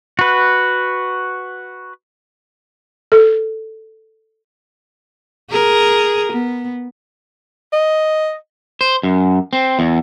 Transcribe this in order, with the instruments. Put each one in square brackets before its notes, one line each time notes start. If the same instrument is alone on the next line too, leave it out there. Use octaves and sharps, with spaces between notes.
[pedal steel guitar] F#4 B4
[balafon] A4
[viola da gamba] G#4 A#4
B3
[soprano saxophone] D#5
[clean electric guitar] C5
F#2
C4
E2